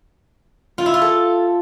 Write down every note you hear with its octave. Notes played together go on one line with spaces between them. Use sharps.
F4
E4
F4
A4